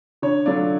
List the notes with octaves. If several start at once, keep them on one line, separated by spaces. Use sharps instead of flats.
D3 C#5
F#3 A3 D4 F4 D5